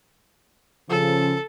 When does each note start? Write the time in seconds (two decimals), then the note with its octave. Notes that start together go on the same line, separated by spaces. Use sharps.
0.90 C#3 F3 A4